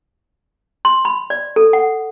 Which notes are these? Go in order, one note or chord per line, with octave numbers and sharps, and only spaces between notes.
C6
B5
D5
A4
F#5